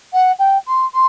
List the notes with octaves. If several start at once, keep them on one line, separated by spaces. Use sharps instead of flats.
F#5
G5
C6
C6